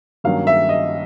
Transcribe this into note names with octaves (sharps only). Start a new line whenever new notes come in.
G2 D#3 F#3 A#3 C#4 F5
E5
D#5